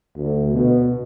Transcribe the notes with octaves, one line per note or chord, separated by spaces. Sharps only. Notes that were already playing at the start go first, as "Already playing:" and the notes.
D2
B2